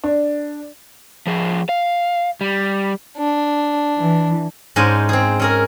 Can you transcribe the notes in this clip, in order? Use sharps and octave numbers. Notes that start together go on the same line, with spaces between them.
D4
F3 G#4
F5
G3
D4
E3
G#2 C#4 D4 C5 D#5 G#5
C4 G#4
C#4 G#4 A#4